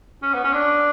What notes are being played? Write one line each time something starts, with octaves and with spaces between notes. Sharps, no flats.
C#4
B3
C#4
D4